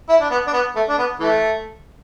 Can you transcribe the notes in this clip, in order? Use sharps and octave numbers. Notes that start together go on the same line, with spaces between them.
E4
D4
B3
D4
B3
A3
D4
B3
E3 A3